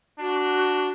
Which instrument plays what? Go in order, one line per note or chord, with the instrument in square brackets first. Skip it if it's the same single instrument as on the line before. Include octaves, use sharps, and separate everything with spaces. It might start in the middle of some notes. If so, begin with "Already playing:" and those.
[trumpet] D4 [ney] F#4